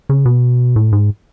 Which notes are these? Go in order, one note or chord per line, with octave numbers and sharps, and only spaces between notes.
C#3
B2
A2
G#2